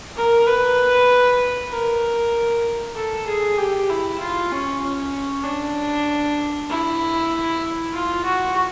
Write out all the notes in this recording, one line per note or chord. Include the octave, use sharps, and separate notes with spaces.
A#4
B4
A#4
A4
G#4
G4
E4
F4
C#4
C#4
D4
E4
F4
F#4